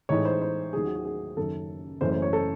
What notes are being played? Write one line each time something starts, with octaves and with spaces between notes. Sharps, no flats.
A2 E3 G#3 D#4 C#5
C5
C5
D#2 D#3 F#3 G#4
F#4
F#4
G#4
F#1 F#2 D#3 A4
F#1 F#2 E3 A3 C#4 C5
C5
C#5
A4